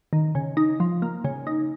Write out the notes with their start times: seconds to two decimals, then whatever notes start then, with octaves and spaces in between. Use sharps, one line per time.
0.13 D#3
0.35 C#3
0.57 D#4
0.80 F3
1.02 A#3
1.24 C#3
1.47 D#4